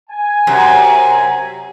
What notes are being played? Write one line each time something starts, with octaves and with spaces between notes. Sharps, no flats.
G#5
F#2 C3